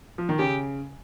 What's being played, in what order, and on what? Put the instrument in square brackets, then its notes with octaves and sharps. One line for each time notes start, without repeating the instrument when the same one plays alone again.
[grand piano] F3
D#3
[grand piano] C#3 [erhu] G4